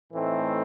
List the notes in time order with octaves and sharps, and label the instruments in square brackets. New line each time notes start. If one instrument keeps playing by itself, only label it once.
[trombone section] A2 E3 A3 C4 D#4